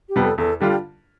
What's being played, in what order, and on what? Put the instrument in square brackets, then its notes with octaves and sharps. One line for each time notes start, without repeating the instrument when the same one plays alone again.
[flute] G4
[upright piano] F2 C3 G3 B3
[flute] A4
[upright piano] E2 [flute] A4
[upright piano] D3 G3 D4 F4 [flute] G4